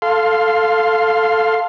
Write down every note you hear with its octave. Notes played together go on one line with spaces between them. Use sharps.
A4 F5 C6